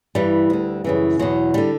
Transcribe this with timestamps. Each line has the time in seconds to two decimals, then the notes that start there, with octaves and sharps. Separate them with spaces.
0.15 G2 E3 G3
0.50 D2 D3
0.84 F#2 C#3 E3
1.19 E2 B2 F#3
1.54 D3 G3